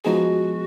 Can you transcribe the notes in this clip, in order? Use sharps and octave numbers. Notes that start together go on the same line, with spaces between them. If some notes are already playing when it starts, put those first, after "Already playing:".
F3 G#3 B3 D#4 F#4 G#4